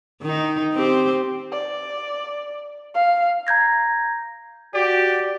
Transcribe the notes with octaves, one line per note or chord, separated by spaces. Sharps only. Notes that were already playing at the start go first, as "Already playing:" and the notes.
D#3 D#4
C4 G4 C5
D5
F5
A#5 G6 G#6 A#6
F#4 G4 D5